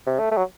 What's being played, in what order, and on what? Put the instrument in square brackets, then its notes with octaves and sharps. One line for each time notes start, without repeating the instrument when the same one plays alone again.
[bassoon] C3
A3
A3
F#3